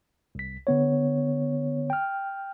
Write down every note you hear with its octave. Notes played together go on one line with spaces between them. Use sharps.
C2 B6
D3 B3 C#5
G5 F6